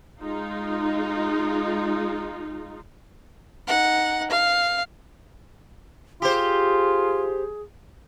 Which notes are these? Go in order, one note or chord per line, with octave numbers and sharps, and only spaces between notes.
G#3 D#4 F4
D#4 F#5
F5
F4 G4 G#4 C5